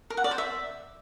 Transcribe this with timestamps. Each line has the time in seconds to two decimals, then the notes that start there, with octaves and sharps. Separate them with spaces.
0.10 A#4
0.17 F#5
0.24 D5
0.31 C5
0.38 E5